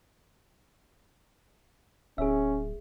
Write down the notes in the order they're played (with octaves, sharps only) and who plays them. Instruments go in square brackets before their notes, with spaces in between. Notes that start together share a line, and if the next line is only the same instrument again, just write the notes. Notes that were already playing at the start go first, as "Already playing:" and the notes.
[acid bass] D1 [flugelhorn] C#4 [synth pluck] G#4 E5